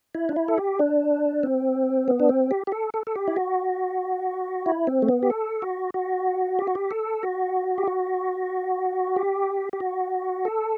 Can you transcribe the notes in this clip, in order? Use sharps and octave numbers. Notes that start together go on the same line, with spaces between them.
E4
D4
E4
A4
G4
D4
C4
B3
D4
C4
G4
G4
A4
A4
A4
G4
E4
F#4
E4
C4
A3
B3
G4
A4
F#4
F#4
G4
F#4
G4
A4
F#4
G4
F#4
G4
G4
F#4
A4